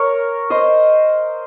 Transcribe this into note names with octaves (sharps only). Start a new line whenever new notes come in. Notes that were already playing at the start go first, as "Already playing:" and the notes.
Already playing: A#4 C#5
C5 D#5